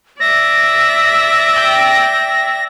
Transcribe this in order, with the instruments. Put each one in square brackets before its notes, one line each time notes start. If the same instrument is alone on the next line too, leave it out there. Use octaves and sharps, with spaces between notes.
[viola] D5 E5 [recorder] A#6
[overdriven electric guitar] G5